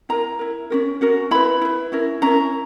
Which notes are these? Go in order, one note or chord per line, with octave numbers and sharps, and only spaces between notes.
E4 A#4 A#5
E4 A#4
C#4 F#4 A#4
C#4 F#4 A#4
E4 B4 B5
E4 B4
C#4 E4 A#4
C#4 E4 A#4 A#5